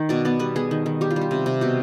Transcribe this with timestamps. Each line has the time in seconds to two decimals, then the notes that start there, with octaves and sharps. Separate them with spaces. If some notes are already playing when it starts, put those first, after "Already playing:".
Already playing: D#3
0.09 B2 D5
0.25 B3 D5
0.39 G3 B4
0.56 B3 G#4
0.71 D#3
0.86 D#3
1.01 G3 G4
1.11 F4
1.16 G3
1.21 G4
1.31 C3
1.46 C3
1.61 B2 G4